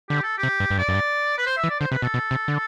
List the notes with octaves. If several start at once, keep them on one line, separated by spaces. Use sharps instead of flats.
D3 G4
A4
G4
C3
G2
G2
F#2 D5
F#2
G2
B4
C5
E5
E3
D5
D3 C5
C3 B4
B2 A4
B2
C3
D3